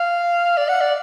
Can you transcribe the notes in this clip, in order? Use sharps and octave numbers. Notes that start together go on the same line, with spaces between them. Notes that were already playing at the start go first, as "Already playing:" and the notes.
Already playing: F5
D5
F#5
D5